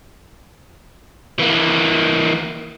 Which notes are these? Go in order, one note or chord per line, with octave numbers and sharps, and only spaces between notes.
E3 A#3